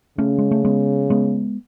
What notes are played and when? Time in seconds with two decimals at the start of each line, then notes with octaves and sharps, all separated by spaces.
0.18 C#3 A3 C#4
0.38 G#3
0.51 A3
0.65 G#3 B3
1.10 G#3 B3